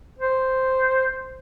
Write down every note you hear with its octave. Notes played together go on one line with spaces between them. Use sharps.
C5